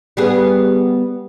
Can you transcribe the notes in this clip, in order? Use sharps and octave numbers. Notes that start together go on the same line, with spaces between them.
G3 B3 G#4